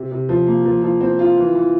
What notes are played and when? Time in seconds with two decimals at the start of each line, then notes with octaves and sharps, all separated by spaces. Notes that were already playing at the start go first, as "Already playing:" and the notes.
Already playing: C3
0.11 C3
0.29 F3
0.47 A#3
0.65 F3
0.83 F3
1.01 C4
1.19 F4
1.37 E3
1.55 E3